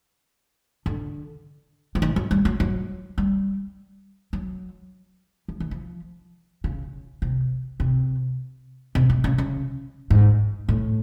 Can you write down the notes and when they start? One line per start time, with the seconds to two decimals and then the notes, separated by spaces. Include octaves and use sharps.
0.86 D3
1.95 F3
2.02 E3
2.16 F#3
2.31 G3
2.45 F#3
2.60 F#3
3.18 G3
4.33 F#3
5.48 F3
5.60 E3
5.71 F3
6.64 C#3
7.22 C3
7.80 C3
8.95 C3
9.10 C3
9.24 C#3
9.38 C#3
10.10 G#2
10.69 A2